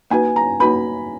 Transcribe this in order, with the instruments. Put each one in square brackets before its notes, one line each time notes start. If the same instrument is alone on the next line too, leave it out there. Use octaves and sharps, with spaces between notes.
[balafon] A#3 D#4 F#4 B4 [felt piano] G#5
[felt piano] A#5
[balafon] A#3 D#4 F#4 B4 [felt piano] B5